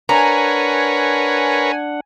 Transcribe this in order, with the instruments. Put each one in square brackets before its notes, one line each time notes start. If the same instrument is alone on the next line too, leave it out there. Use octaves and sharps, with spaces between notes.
[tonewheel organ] D4 F#5 [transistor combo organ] A#4 B4 C#5 [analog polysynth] G#5 [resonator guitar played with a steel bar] A#5